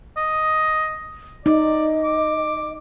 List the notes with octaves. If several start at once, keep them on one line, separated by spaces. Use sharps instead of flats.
D#5
D#4 D5 D#5
D6